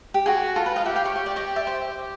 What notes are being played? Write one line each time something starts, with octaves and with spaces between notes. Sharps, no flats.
G4
F#4 G#4
F4 A4
B4
D#5 F5
G4 E5 F#5
F5 G5
C#5
C#5
D5
C#5 D#5
D5 E5
C5